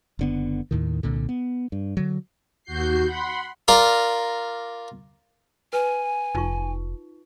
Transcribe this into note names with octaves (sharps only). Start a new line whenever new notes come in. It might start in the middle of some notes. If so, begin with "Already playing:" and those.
F#1 D3 B3
D#2 A2 D#3
C2 A#2 D3
B3
G2
D3 F#3
D#2 F#4 G6 C7
F#5 B5 C6
F4 A#4 D5 A#5
B4 G#5
F1 D#4 F4 C#6